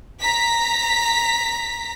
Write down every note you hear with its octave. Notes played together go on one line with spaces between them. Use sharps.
A#5 B6